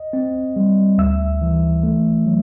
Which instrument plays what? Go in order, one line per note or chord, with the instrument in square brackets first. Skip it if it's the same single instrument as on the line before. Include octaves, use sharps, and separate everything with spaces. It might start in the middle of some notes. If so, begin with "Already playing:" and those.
Already playing: [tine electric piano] D#5
C4
G3
D2 E5 E6
E3
A3
F#3